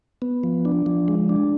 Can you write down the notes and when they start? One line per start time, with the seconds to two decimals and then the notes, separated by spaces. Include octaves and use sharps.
0.22 B3
0.43 F3
0.65 D4
0.86 F3
1.08 G#3
1.29 D4